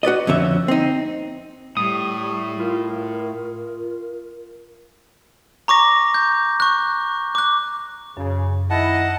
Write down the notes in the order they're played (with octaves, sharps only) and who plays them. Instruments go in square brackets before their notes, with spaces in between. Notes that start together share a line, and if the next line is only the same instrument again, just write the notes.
[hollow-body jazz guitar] F#4 B4 D5 D#5
F2 D3 C#4 E5
C4 D#4
[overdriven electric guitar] A2 [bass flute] G3 [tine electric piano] D#6
[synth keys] F4 [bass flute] A#4
[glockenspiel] A#5 C#6 D6 A#6
G6
C#6 F#6
D6 F#6
[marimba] F#2 [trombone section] C#3
[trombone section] D#3 E4 [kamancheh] D#5 [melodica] F#5 A5